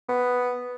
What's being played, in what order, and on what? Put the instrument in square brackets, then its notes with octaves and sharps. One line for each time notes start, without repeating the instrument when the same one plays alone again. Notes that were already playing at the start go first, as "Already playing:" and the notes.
[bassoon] B3